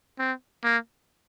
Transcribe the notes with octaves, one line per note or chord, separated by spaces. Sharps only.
C4
A#3